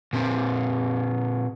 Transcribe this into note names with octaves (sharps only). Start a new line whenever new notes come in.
A#2 C4